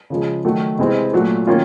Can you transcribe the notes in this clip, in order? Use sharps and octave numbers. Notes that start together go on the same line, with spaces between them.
C#3 F3 G#3
D#3 F#3 A3
C3 E3 G#3 C4
A#2 F#3 A3
D#3 F#3 A#3 C#4 F4